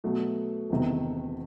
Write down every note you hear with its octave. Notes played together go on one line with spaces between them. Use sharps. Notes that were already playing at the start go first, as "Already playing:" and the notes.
B2 F#3 A3
E1 E2 C3 D#3